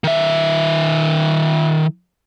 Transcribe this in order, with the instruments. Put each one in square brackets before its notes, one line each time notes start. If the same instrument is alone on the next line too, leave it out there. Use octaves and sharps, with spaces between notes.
[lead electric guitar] D#3 E5